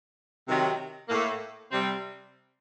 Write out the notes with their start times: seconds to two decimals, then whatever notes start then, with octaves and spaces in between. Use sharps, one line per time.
0.48 C3 D#3 F#3
1.08 A2 A#3
1.14 A3
1.70 C3 G3 C4